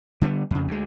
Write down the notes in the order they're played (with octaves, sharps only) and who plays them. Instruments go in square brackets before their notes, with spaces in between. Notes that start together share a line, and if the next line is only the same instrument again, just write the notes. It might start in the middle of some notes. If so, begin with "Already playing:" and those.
[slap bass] D3 G3 G#3 B3
F2 C#3
D2 G#3